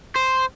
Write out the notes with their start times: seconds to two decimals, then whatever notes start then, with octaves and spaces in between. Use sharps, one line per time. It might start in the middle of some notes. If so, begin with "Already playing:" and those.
0.15 C5